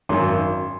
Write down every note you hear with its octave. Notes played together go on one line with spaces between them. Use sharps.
G#1 F#2 D#3 C6